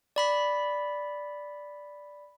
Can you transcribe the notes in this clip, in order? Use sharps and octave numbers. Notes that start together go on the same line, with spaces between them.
D5 B5 B6